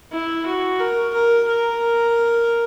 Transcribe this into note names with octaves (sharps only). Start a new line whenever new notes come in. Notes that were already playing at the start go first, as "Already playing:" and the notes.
E4
F#4
A#4
A#4
A#4